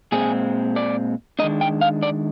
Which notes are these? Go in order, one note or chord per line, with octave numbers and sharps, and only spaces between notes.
A#2 G#3 C4 G#4
D5
D#3 G#3 D4 D#5
G5
F5
D5